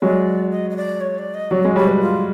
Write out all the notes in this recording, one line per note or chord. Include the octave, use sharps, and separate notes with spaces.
F#3 G#3 D5
D#5
D#5
D5
C#5
D5
D#5
F#3 D5
G#3 C#5
G3 C#5
B4
F4